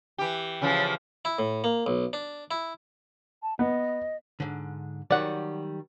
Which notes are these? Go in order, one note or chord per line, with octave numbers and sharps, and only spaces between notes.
E3 G4
C#3 E3 F3
E4
A2
A#3
B1
D4
E4
A5
B3 D#5
G#2 D3
D#3 F#3 G3 D5 F#5